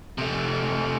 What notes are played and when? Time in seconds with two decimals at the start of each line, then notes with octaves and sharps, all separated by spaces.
0.18 C3 A3